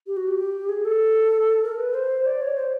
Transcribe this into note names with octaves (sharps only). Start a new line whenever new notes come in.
G4
F#4
G4
G#4
A4
A#4
B4
C5
D5
C#5
C5